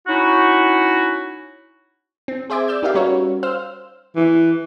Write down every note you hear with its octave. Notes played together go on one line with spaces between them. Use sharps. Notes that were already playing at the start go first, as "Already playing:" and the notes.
C#4 D#4 E4 F#4
C4
G#4 C5 E5 D6 G#6
D5 E6 G6
D#4 G4 A#4 D5 E5 F5
G3 C#4 F#4 A#4 B4 C#5
C5 F5 E6 F6
E3